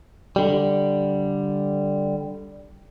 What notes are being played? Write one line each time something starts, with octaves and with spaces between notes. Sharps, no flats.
D3 G3